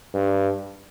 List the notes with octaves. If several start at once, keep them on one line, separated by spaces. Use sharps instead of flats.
G2